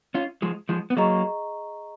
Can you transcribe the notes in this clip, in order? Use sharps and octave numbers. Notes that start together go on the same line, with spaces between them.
C#4 F4
F3 G#3
F3 G#3
B3
F#3 A#3 G#4 D#5 A#5 C#6